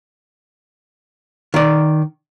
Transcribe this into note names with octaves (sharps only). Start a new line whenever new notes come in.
D#3 D5